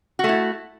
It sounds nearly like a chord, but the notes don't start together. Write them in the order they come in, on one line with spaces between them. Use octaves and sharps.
F#4 A3 E4